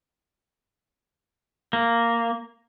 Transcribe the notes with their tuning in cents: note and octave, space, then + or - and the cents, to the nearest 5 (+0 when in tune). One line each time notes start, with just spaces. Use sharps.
A#3 -5